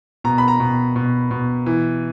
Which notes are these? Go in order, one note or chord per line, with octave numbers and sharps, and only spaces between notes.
B2 A#5
B5
A#5
B2
B2
B2
E3